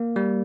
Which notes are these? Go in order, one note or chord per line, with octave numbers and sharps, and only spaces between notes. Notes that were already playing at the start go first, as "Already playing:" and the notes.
Already playing: A#3
G3